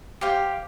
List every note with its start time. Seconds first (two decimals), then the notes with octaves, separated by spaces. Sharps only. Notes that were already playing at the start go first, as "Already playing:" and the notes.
0.21 G4 C5 F5